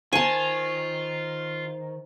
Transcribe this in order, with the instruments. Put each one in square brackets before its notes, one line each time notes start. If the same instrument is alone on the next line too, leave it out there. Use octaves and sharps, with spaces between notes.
[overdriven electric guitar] D#3 [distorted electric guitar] F4 [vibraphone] C5 [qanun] G#5 A5